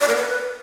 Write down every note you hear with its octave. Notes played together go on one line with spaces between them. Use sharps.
D5
A#4
B4